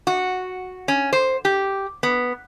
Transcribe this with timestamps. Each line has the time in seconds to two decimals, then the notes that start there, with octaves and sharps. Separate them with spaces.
0.07 F#4
0.88 C#4
1.13 C5
1.45 G4
2.03 B3